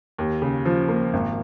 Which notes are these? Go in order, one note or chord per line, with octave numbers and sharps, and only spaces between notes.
D#2
C#3
F3
A#3
G#1